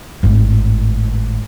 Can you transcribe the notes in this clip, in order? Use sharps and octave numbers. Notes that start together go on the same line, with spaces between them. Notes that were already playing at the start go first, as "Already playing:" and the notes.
G#1 A2